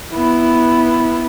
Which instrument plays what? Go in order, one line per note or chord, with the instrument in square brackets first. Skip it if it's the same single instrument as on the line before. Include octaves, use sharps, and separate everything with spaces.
[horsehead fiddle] B3 E4